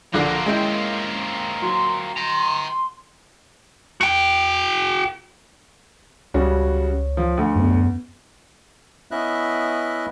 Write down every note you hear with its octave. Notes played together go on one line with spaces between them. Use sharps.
A#1 D3 A#3 C4 F#6
G#3 C#4 E4 G5
F#3 C6
G5 A#5
F#4 G5
C#2 C#3 G3 F#4 C#5
F3
D2
F#2 B3
B3 C#4 E4 D#5 E5 F#6